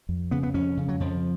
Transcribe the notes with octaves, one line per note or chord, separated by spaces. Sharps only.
F2
C#3 B3
B3
F2 C#4
C#3
F#3
F2 F3